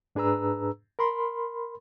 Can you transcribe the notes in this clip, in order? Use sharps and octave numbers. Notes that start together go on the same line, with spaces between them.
G#2 D4 G#4 B4 A#5 E6
A#4 B5 C6